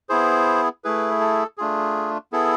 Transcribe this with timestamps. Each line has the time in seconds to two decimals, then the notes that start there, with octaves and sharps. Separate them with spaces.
0.09 B3 E4 G#4 C5
0.84 A3 E4 G#4 B4
1.21 A4
1.58 A3 D4 F4 G#4
2.32 B3 E4 G#4 A4